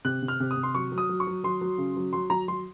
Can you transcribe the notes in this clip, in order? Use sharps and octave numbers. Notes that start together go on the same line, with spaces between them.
C3 F#6
C3
F6
C3
D#6
C3
C6
F#3 C#6
F#3
D#6
F#3
C#6
F#3
F#3 C6
F#3
C#3
F#3
F#3 C6
F#3 A#5
F#3 C6